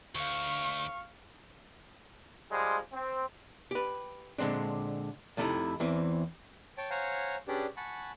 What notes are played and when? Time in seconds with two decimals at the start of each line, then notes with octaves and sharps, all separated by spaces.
0.15 D2 F5 C#6
2.51 F3 G3 G#3
2.92 C4
3.71 G4 B4
4.38 A#2 D3 G#3 C4 D4
5.37 F2 C3 A3 D#4 E4
5.80 E2 E3 C4
6.77 C#5 G5 A5
6.90 C5 C#5 F5 F#5 G#5 A#5
7.48 C#4 D4 G4 G#4 B4 D5
7.77 F#5 G#5 A5 B5 C#6